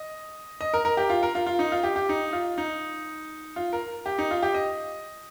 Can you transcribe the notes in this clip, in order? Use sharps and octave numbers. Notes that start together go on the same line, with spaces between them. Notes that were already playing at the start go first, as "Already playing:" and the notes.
Already playing: D#5
D#5
A#4
A#4
G4
F4
A#4
F4
F4
D#4
F4
G4
G4
D#4
F4
D#4
F4
A#4
G4
D#4
F4
G4
D#5